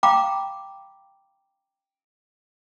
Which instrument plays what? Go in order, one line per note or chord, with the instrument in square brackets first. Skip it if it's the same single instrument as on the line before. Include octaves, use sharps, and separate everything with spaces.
[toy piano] F5 G5 A#5 B5 D6